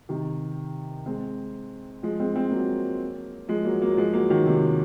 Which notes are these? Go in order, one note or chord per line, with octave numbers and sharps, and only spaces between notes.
C3 D#3
G#3 C4
F3 G#3
G#3 C4
G#3 C4
F#3 A#3
F3 G#3
F#3 A#3
F#3 A#3
F#3
F3 G#3
F#3 A#3
D#3 F#3
C3 D#3